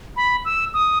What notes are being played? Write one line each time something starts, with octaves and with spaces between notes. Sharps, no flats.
B5
E6
D#6